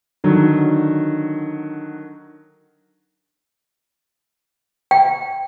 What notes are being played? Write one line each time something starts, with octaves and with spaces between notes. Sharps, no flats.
D3 D#3 F#3
G5